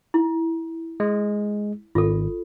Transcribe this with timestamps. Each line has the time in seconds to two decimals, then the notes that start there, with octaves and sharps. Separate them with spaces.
0.14 E4
1.00 G#3
1.95 G#1 F4 A4